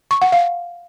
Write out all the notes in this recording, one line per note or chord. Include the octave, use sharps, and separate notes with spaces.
C#6
F#5
F5